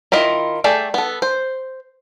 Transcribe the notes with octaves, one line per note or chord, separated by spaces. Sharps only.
D#3 E4 F4 D#5
A3 G#4 A4 D5 G5
B3 A4
C5